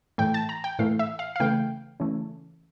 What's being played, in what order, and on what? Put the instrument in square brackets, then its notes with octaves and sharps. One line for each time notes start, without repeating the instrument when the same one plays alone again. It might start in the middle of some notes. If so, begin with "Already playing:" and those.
[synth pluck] A2 E3 A3 G5
A5
A#5
G5
A2 E3 A3 F5
E5
F5
F5
C#3 E3 A3 G5
C#3 E3 A3